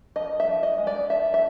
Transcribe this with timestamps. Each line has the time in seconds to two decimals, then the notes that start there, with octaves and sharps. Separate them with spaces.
0.16 F3 D#5
0.40 E5
0.48 F3
0.63 D#5
0.78 G#3
0.87 D5
1.10 F3 E5
1.34 E5